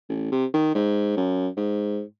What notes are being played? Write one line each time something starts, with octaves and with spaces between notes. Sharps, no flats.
A1
C3
D#3
G#2
F#2
G#2